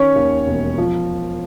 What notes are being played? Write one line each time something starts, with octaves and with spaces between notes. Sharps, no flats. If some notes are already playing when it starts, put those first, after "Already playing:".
Already playing: D#3 C#4 C#5
D#2
E1
F3